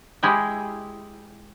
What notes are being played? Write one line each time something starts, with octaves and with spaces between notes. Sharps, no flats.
G#3 E4 G4 E5